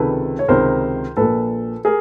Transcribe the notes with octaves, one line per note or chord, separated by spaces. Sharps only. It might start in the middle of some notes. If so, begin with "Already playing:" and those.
Already playing: C#2 C3 D#3 A4 B4
C#5
C#2 C3 D#3 A#4 C5
A#1 A#2 A4 B4
G#4 A#4